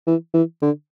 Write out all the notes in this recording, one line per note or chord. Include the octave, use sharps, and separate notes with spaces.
E3
E3
D3